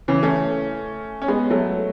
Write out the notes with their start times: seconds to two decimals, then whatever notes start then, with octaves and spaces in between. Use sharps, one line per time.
0.08 C#3 E3
0.23 A3 C#4
1.22 C#4
1.28 G#3 B3
1.50 F#3 A3